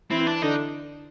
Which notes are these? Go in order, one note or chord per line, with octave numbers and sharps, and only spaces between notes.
E3 C4 E4
D4
D3 D4 D#4